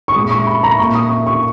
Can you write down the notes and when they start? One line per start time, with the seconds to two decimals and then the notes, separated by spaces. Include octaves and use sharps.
0.08 C#6
0.15 A#2 G#3 D#6
0.31 C#6
0.47 B5
0.63 A#5
0.78 A#2 A#3 C#6
0.95 D#6
1.10 C#6
1.27 C#6